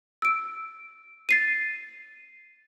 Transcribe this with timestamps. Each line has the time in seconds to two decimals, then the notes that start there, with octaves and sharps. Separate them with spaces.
0.22 E6 D7
1.29 A6 C7 D#7